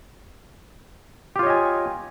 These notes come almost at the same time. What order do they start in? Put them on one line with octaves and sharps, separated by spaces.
G4 F4 C#5 D#5 G#5